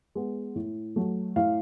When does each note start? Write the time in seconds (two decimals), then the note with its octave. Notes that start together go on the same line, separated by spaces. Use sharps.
0.15 G#3 B3
0.55 A2
0.96 F#3 A3
1.36 A2 F5